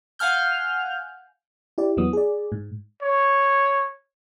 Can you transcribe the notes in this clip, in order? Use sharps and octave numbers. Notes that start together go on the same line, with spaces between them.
F5 F#5 G#5 F6 G6
E4 G4 D5
E2 E3 F#3 B3 D#6
G#4 D5
G#2
C#5